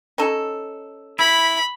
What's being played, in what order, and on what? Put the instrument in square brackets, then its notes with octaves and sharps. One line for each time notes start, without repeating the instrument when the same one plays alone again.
[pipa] C#4 D#4 A4
[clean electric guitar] E4 [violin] B5